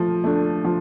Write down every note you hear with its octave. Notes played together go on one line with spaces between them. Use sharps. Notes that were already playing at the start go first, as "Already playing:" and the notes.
Already playing: F3 A3
A3 D4
F3